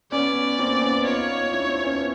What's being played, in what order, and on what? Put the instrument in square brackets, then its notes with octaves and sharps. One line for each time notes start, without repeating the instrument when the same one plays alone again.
[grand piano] B3 C#4 [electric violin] D5
[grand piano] A#3 C4
B3 C#4
[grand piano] D#4 F4 [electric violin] C#5
[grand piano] D4 E4
C4 D4
B3 C#4